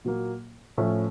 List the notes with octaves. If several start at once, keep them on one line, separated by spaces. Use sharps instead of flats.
A#2 F#3 A#3
A2 F3 A3 C#4